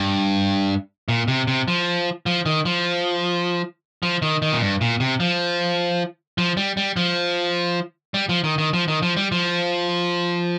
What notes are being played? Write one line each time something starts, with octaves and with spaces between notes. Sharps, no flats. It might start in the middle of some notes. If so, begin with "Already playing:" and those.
Already playing: G2
A#2
C3
C3
F3
F3
D#3
F3
F3
D#3
D#3
A#2
G2
A#2
C3
F3
F3
G3
G3
F3
G3
F3
D#3
D#3
F3
D#3
F3
G3
F3